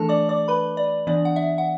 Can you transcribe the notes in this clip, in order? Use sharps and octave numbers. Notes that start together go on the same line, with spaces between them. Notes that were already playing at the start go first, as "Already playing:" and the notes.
Already playing: E3 A3 D4 A4 A5
D5 D6
D5 D6
B4 B5
D5
E3 B3 D4 D5
F#5
E5
F#5